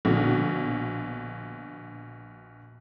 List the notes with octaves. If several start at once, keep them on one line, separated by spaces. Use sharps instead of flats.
A#1 B2 D3